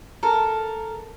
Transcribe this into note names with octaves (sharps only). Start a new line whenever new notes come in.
A4 A#4